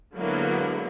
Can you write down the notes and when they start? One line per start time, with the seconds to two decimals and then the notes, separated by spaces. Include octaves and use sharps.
0.15 D3 F#3 G#3 A#3 B3 E4